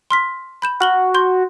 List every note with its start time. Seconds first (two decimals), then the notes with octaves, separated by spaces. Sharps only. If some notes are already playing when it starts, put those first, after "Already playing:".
0.11 C6 F6 B6
0.62 B5 G6 E7
0.80 F#4 F6 F#7 G7
1.14 C6 G6 G7